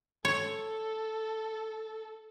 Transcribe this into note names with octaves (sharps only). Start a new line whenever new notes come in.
A4 C#5